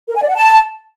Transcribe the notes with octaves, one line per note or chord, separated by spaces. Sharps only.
A#4
G#5
D5
F#5
A5